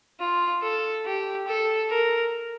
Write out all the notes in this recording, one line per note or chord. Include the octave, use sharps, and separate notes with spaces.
F4
A4
G4
A4
A#4